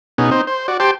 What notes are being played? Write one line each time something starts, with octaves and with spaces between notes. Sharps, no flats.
B2 B3 C#4 D#4 G#4
C4 D#4 C5
C5
F#4 D5
G4 C5 G5 A5 C6 D6